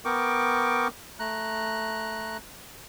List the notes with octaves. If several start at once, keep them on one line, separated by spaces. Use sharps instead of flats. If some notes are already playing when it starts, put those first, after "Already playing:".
B3 A#4 G5 C#6 D6
A3 A#5 F#6